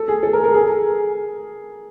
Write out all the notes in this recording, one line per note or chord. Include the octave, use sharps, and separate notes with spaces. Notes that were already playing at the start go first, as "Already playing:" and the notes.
Already playing: A4
G#4
A4
A#4
A#4
G#4